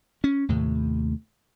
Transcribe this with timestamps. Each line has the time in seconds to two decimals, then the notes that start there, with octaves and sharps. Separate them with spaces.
0.24 C#4
0.49 D#2 A2 C3